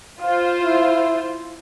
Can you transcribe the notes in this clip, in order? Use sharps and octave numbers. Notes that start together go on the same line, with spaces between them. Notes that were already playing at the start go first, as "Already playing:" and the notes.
F4 C5 F5
E4